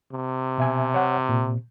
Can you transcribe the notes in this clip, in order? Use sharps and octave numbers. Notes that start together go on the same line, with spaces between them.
C3
B2 E5 G#5
C#5 F#5
A#2